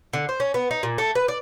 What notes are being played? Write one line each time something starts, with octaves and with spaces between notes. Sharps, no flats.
D3
C5
C#4
B3
D#4
A#2
A3
B4
D5